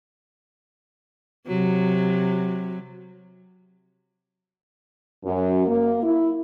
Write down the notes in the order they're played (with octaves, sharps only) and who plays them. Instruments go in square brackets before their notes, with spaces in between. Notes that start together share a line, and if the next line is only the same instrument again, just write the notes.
[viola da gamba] C3 F#3
[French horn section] F#2
A#3
E4